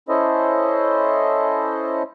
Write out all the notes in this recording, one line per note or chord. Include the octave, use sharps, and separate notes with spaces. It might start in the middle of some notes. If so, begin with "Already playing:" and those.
C#4 E4 A4 C5 D#5